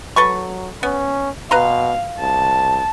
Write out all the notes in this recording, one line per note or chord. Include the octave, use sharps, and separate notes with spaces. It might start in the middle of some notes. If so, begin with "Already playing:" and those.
F#3 A4 B4 C#6
B3 C#4
B2 B4 F5 A#5 C6
C2 A5